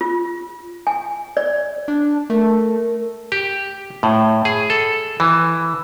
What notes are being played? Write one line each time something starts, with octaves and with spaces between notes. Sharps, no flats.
F4
G#5
D5
D4
A3 A#4
G4
A2
G#4
A4
E3